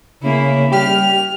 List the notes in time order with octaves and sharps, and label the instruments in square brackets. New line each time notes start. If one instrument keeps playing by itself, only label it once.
[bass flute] C#3 [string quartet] A#3 E4
[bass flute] G3 [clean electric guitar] G4 [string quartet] F6